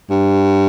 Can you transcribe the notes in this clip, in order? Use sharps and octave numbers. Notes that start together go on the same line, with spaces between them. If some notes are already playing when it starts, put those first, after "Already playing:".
G2